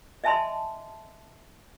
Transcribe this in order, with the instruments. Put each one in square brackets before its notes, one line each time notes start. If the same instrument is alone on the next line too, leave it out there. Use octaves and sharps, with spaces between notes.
[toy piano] D#5 E5 G#5 A5 B5 C6